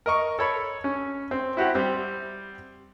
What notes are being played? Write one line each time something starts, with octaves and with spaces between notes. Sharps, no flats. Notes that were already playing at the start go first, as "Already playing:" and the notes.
A#4 D#5 C#6
A4 C#5 B5
C#4
C4
E4 F#4 G4 C5
G3 C4